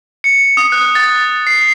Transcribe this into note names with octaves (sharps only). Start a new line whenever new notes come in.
C#7
D#6
F#6
A6
C7